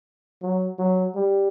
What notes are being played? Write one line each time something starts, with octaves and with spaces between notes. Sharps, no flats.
F#3
F#3
G3